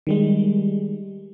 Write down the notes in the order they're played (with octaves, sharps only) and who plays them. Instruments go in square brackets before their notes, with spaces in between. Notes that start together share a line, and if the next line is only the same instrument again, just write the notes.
[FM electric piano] D#3 G3 G#3